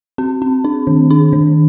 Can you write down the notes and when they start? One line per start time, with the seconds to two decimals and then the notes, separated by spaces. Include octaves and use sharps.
0.18 C4
0.42 C4
0.65 D4
0.87 D#3
1.11 D4
1.33 D#3